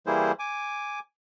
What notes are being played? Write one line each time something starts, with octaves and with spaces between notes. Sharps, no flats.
E3 G3 A#3 E4 G#4 C5
G#5 D6